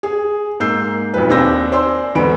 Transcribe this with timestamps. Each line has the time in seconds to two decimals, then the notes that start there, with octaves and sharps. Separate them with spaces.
0.03 G#4
0.60 G#2 A#3 E6 G6 C7
1.14 B1 F2 B4
1.29 D#2 C4 D4 E6 G6 A#6
1.72 C5 D5 G#5 C6 E6
2.15 E2 G#2 D3 B3 B5 D7